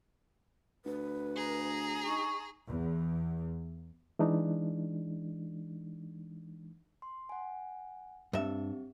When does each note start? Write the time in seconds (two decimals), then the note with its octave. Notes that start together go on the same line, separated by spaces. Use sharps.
0.85 D2 B4
1.36 G#4 A#5
2.06 D#4 C#6
2.68 E2
4.19 E3 G#3 D4 D#4
7.02 C6
7.29 F#5 G#5
8.33 G2 C4 G4 E5